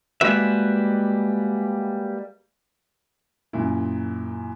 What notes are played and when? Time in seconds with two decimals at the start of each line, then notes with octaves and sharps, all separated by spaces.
0.21 G3 G#3 A#3 F#4 B4 E5
3.53 F#2 A#2 E4